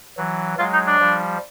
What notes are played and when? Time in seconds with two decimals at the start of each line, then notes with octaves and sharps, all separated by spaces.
0.17 E3 F#3
0.59 F#3 G#3 F4
0.73 D#4
0.87 D4
1.00 F3 G3